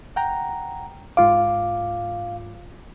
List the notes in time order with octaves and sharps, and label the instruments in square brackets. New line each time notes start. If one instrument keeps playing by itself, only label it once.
[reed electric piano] F#5 G5 A#5
[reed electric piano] G#2 F4 D6 [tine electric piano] F5